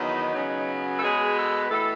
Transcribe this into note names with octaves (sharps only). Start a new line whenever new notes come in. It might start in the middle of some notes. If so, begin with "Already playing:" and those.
Already playing: E2 D#3 F#3 B3 D#4
C#3 F#3 B3
A4
B2 G#3 B3 G#4
A4
B4
A2 E3 B3 A4